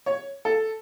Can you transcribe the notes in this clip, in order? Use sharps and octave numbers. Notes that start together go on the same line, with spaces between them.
C#5
A4